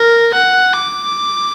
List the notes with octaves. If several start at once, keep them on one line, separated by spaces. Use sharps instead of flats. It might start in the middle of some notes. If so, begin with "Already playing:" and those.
Already playing: A#4
F#5
D6